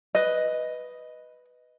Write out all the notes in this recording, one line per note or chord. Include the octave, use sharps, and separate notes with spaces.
B4 D#5